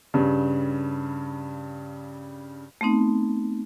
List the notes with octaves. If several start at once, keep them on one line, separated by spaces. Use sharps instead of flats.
G2 C#3
A3 B3 C4 D#4